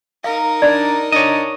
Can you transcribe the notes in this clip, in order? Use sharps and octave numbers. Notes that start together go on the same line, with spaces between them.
D#4 A#4 F5
D4 D5 B5
D4 C#5 D#5